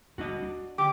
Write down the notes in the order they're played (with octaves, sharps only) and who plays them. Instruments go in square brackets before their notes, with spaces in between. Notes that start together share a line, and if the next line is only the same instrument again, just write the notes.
[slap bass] D2 G3 D4 [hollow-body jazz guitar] F#4 D#5
[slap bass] D4
[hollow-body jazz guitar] D3 [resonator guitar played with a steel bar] G4 [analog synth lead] D6